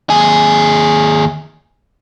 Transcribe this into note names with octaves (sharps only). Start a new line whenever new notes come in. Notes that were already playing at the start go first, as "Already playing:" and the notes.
D#2 G#4